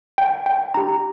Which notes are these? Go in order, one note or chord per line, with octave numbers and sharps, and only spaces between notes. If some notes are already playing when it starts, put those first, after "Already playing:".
G5
G5
D4 G4 A#5